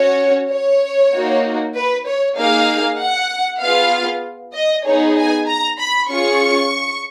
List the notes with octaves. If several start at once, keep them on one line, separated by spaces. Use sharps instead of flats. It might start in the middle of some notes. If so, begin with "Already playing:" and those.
Already playing: C#4 F#4 C#5
C#5
A#3 D#4 F#4
B4
C#5
A#3 D#4 G#4 F5
F#5
B3 F4 G#4 F5
D#5
B3 D#4 G#4 C#5
G#5
A#5
B5
C#4 F4 G#4 C#6